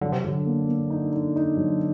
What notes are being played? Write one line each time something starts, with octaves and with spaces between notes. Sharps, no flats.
D3 F#3
C3
D3 F#3
A#3
A#3
D#4
D#4
D#4
F#3